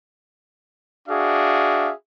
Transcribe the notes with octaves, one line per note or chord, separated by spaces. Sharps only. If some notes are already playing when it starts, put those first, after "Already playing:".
D4 F#4 G#4 E5 F5